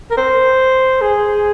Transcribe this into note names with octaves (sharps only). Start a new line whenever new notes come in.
A#4
C5
G#4